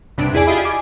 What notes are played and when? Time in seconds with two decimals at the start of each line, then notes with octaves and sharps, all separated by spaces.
0.18 B1 G2 C3 D4 D7
0.34 E2 E4 G#4 D5 G#5 D7
0.47 F4 G4 G#4 D#5 E5 B5
0.65 G#5 D6 D7